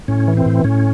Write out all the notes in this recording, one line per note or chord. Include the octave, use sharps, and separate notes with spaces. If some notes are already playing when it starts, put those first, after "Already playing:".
A2 C#4
E3
C4
A2
A2 C#4